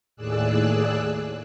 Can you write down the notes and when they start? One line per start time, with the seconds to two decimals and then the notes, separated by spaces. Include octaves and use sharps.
0.16 D#2 A2 G#4 D5 E6 F#6